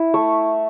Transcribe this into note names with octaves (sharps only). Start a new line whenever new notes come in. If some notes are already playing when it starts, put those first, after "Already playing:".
Already playing: E4
A3 C#6